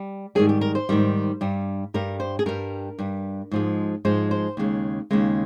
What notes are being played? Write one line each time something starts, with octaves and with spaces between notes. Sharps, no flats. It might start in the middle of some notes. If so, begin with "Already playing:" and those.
Already playing: G3
G#2 D#3 G3 G#4
G4
A#4
C5
G#2 D#3 G3
G2 G3
G2 G3 A#4
C5
G#4
G2 G3 A#4
G2 G3
G#2 F3 G#3
G#2 F3 G#3 C5
C5
D#2 C#3 G#3
D#2 C#3 G#3